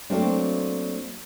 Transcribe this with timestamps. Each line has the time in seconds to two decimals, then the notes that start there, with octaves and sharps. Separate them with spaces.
0.10 F#3 A3 A#3 C4 D4